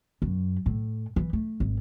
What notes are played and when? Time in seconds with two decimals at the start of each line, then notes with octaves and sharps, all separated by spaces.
0.22 F#2
0.66 A2
1.16 E3
1.33 A3
1.60 G#1